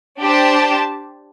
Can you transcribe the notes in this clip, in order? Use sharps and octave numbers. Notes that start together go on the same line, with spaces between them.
D4 G4 C5 A5